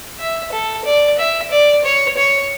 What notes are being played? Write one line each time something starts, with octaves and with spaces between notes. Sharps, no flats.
E5
A4
D5
E5
D5
C#5
C#5